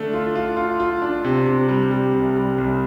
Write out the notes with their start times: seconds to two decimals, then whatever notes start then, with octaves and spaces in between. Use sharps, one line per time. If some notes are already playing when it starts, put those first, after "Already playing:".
Already playing: D3 A3 D4
0.13 F4
0.35 F4
0.57 F4
0.80 F4
1.02 D4
1.24 C3
1.47 C3
1.68 G3
1.91 G3
2.13 C2
2.36 G3
2.58 C2